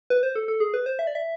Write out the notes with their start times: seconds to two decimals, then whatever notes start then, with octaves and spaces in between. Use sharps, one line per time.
0.10 B4
0.23 C5
0.36 A4
0.48 A4
0.60 G#4
0.74 B4
0.86 C5
0.99 E5
1.07 D5
1.15 E5